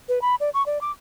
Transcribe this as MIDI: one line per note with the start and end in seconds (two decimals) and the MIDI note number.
0.09 0.22 71
0.22 0.35 83
0.40 0.50 74
0.54 0.65 85
0.66 0.81 74
0.81 0.92 86